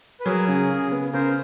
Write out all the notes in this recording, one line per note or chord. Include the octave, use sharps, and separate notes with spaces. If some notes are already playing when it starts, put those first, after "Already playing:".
B4
F#3 G#4 A#4
C#3
C#3
B3
C#3 A#4 C5